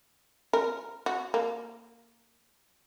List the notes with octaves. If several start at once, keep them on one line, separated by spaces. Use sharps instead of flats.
A#4
F#4
A#3